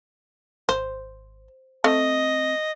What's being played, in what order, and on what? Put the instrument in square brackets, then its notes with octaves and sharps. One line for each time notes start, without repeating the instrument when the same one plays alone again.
[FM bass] G#1 [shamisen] C5
[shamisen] A3 [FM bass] C4 [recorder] D#5